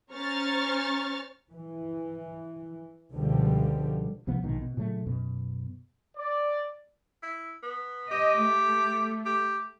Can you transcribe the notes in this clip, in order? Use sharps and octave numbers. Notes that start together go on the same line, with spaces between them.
C#4 C5 A#5 C#6 F6 A6
E3
C#2 B2 D3 F3 G3
C2 C3 F3 B3
A#1 G#2 B2 D#3
B2
A#2 C#3 F#3 A3
F#2 B2
D5
E4
B3
G4 D#5
A3
G4